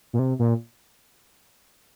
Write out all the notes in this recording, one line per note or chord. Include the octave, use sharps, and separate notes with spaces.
A#2
C3
A#2